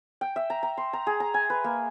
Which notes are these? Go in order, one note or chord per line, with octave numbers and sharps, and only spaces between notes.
G5
E5
A#5
A#5
C6
A#5
G#4
A#5
G#5
B4
A#3